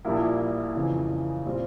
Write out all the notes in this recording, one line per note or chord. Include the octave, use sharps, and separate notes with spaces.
A#1 A#2 G3 A#3 E4
F2 C#3 E3
A#2 G3 C4